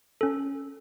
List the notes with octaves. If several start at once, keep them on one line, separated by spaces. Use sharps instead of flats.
C#4 A4